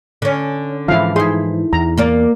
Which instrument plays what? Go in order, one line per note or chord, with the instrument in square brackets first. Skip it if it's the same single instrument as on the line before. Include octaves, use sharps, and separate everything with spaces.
[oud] D3 C#4
[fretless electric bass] G#2 E3 F3 [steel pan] E4 F5
[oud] D#4 E4 [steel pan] G#4 C6
[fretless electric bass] E2 [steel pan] A#5
[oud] A#3 A#4 D5